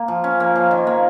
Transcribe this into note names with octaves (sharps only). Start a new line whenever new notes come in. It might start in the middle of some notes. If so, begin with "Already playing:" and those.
Already playing: A#3
F3
C#4
A#3
F3
D#3
A#3